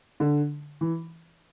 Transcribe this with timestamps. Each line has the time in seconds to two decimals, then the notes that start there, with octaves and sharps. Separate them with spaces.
0.20 D3
0.81 E3